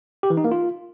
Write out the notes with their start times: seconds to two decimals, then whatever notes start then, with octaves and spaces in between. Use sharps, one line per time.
0.23 G4
0.30 E3
0.37 D#4
0.44 A#3
0.52 F4